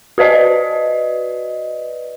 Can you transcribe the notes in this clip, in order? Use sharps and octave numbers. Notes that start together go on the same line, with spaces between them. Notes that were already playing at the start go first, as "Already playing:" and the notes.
F#4 B4 D5 D#5